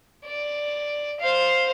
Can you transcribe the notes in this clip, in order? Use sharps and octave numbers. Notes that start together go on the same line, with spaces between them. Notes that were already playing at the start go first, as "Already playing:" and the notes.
D5
C5 F5